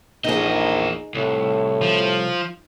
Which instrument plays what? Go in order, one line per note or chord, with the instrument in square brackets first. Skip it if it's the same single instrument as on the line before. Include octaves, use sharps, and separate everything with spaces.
[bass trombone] A#1 [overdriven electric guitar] E2 D#5 [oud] D#4 G#4
[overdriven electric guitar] C2 [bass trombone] A2
[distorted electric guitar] F3